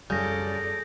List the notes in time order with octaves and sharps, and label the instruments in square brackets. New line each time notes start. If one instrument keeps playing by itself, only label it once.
[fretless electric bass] F#2 F#3 G3 [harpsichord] C#3 [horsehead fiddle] A4 D5 [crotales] G6 A#6